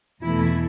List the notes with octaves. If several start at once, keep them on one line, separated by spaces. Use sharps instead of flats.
E2 B2 E3 A3 E4